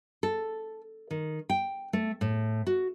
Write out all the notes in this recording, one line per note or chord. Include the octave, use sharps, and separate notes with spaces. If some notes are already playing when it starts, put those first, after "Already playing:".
A4
D#3
G5
A3
A2
F#4